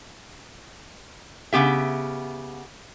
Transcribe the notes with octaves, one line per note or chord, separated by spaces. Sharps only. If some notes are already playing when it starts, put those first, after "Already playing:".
C#3 B3 G4 E5